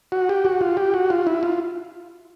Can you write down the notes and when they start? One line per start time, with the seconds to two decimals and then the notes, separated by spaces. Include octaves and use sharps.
0.12 F#4
0.29 G4
0.45 F#4
0.61 F4
0.77 G4
0.94 F#4
1.10 F4
1.27 E4
1.43 F4